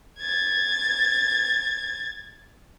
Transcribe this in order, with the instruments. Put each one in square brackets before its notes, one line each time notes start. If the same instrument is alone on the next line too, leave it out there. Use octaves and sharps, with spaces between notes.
[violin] G#6 A6